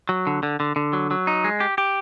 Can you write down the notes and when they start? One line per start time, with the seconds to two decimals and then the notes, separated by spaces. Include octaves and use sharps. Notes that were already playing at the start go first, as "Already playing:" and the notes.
0.09 F#3
0.27 D3
0.43 D3
0.60 D3
0.76 D3
0.93 F#3
1.11 F#3
1.27 D#4
1.44 G#3
1.60 G4
1.78 G4